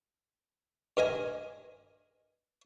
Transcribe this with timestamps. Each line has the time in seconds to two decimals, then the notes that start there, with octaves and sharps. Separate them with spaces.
0.97 G2 A#4 D#5 G#5